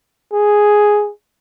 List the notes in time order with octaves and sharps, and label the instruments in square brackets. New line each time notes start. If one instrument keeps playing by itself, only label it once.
[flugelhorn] G#4